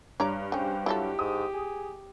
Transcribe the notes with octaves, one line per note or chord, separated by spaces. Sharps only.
G2 C#5 D5 A#5
C#3 C#4 G4 C5
F#3 E4 F4 G4 A4
G#2 D#6
G#4